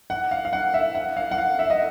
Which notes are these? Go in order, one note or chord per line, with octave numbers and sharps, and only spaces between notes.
F#5
F5
F5
F#5
E5
F#5
F5
F#5
F5
E5
D#5